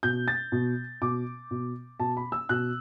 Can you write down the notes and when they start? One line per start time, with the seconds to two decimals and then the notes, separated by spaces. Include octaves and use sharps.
0.03 B2 G6
0.28 A6
0.52 B2
1.02 B2 D6
1.51 B2
2.00 B2 A5
2.17 B5
2.32 E6
2.49 B2 F#6